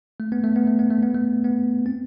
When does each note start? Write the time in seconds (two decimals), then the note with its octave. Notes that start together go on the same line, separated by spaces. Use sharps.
0.20 A3
0.32 B3
0.44 A3
0.56 B3
0.67 A3
0.79 B3
0.90 A3
1.02 B3
1.15 A3
1.44 B3
1.86 C4